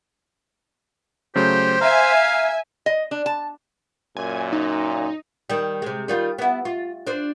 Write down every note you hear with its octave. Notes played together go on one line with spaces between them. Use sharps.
C#3 F#3 A3 G4 C5
E5 F5 G#5 A#5
D#5
D4
A5
F#2 A#2 G#5
D#4
D#3 G3
C3 G#3
D#3 G3 F4
B3 E4
F4
D4 C5